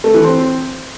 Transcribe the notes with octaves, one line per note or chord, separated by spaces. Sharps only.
A3
E3
C4